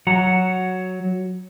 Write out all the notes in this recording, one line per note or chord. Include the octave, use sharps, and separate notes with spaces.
F#3 F#5 A#5